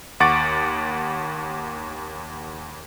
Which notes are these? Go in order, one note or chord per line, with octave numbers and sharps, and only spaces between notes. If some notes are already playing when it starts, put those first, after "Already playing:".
D#2 F#5 C#6 D6 A6 D7